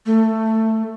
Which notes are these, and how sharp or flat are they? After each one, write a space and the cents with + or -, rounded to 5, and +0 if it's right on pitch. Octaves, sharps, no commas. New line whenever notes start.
A3 +10